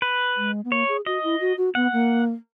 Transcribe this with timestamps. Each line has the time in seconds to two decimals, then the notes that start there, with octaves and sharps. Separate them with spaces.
0.02 B4
0.37 G#3
0.64 B3
0.71 A#3 C#5
0.89 G#4
1.06 F#4 D#5
1.23 E4
1.40 F#4
1.57 F#4
1.75 B3 F#5
1.93 A#3